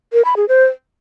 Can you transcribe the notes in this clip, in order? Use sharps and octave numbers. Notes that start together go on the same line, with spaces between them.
A#4
B5
G#4
C5